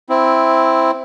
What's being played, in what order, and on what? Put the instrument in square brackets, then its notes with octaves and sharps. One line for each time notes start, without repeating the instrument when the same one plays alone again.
[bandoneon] C4 E4